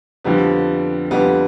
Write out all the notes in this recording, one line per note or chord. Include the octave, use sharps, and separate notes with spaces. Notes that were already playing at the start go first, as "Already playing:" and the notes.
F2 D3 F3 G3 B3
F2 D3 F3 G3 B3